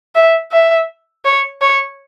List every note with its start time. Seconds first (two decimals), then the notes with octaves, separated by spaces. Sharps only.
0.15 E5
0.52 E5
1.25 C#5
1.61 C#5